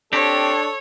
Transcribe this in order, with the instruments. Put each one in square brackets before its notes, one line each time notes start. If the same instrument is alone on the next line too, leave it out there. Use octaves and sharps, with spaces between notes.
[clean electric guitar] C4 G4 [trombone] D4 [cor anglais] A4 [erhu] C#5